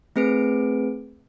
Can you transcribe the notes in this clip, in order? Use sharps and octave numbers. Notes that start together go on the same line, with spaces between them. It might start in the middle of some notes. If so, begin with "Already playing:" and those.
A3 C4 G#4 B4 D7